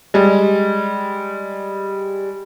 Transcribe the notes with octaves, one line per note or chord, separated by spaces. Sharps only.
G3 G#3